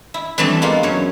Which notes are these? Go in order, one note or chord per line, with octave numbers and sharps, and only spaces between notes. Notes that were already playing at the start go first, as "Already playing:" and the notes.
E4
E3 G3 A3 C4 D4
G#3 A#3 B3 F4
F#2 C#5